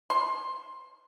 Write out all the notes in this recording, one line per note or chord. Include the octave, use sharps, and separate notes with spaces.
C6